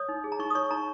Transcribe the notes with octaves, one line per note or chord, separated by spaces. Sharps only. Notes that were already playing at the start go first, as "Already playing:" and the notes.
Already playing: C#5 D#6
D#4
G#4
A#5
D#4 C#6
D#6
C#5 C#6
D#4 A#5